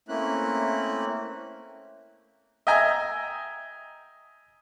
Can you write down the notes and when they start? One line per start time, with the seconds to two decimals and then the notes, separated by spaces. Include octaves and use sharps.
0.09 A3 A#3 C4 C#4 E4 F#6
2.67 D#5 E5 G5 G#5 A#5